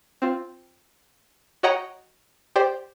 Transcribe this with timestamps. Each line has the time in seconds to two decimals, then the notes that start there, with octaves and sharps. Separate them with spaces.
0.22 C4 F4
1.63 F#4 C#5 D#5 F#5 G5 A#5
2.56 G4 C5 D5 G5